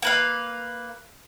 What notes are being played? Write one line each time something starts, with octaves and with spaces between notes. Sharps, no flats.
A#3 B4 F5